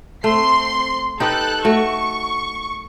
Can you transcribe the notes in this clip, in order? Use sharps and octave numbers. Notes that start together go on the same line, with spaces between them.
A3 C4 C6 C7
D#4 G4 A4 B4 F#6
A3 F#4 C#6